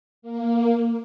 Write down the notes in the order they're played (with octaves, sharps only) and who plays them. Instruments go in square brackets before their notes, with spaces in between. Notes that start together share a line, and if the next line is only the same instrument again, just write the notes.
[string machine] A#3